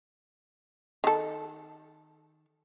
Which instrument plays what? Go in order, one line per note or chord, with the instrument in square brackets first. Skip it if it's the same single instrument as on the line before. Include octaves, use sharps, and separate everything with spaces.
[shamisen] D#3 A4